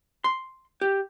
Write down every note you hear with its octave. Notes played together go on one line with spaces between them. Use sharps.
C6
G4